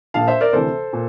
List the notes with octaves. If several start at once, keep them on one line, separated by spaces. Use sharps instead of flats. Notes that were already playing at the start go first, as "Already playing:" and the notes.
A#1 A#2 F5 A5
C5 E5
A#4 D5
D2 C3 E3 A4 C5
A#2